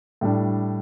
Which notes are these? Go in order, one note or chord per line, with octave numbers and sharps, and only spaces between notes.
A2 G3 D4